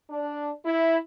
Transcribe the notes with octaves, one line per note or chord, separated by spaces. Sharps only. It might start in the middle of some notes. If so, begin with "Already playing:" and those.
D4
E4